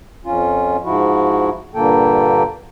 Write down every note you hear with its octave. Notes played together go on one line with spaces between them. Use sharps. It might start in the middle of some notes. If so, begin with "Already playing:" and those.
F2 C#4 F4
G#2 F3 E4 F#4
G2 A#2 D3 A#3 A4 G5